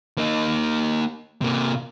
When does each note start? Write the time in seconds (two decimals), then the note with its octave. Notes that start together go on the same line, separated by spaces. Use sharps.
0.18 A#3 D#4
1.41 C3 A#3